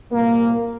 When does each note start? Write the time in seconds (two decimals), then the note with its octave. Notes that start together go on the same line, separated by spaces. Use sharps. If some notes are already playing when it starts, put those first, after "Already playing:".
0.12 C2 A#2 A#3